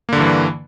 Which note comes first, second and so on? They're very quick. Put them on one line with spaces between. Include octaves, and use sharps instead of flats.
A#3 D3 G2 E3